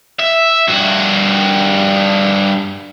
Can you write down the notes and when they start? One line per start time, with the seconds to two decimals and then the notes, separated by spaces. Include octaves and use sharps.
0.19 E5
0.68 G2 F#4